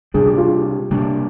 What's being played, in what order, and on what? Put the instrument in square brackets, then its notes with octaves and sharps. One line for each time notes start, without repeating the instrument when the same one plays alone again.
[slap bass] C3 G3 A#3 D4 [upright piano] G#4
[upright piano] G4
F4
G4
[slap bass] C3 G3 A#3 D4